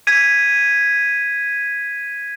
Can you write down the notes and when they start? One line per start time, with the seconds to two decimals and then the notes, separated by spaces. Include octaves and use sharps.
0.07 G#6 B6 D#7